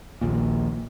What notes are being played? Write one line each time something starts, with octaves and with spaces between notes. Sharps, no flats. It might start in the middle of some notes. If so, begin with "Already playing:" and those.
A#1 D#2 A#2